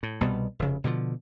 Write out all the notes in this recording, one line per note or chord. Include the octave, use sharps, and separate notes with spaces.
A2
C2 B2 G3 B3
F1 C#3
B2 D3 E3 F3